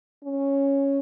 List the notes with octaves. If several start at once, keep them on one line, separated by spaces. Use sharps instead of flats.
C#4